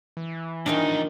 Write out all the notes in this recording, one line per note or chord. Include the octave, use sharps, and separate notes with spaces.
E3
E2 D#3 F3 D4 D#4